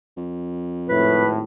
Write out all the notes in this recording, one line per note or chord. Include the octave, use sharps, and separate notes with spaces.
F2
G#1 A2 B4